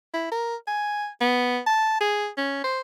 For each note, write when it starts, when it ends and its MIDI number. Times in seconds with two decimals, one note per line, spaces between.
0.14 0.28 64
0.32 0.55 70
0.67 1.07 80
1.21 1.60 59
1.67 1.96 81
2.01 2.28 68
2.38 2.61 61
2.64 2.81 72